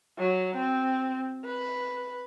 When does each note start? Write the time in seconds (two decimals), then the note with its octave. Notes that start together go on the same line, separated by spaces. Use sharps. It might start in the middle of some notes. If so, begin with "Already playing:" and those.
0.19 F#3
0.56 C4
1.45 B4